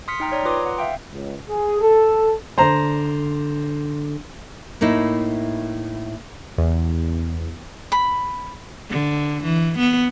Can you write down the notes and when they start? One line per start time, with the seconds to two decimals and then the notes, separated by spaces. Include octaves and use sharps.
0.08 C6 D#6 F6 B6 C#7
0.20 D#4 G5 A#5
0.32 C#5 D5 A#5
0.45 F4 B4 A#5 C6 D6 D#6
0.66 F#5
0.78 E5 F5 G5
1.13 C#2
1.49 G#4
1.82 A4
2.58 D3 C5 A5 A#5
4.81 A2 A#3 D#4 E4
6.58 E2
7.92 B5
8.90 D3
9.44 E3
9.79 B3